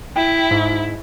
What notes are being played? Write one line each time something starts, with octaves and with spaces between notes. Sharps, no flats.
E4 G5
G#2